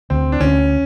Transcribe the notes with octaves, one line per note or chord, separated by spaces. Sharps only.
D2 C4
D4
D2 C#4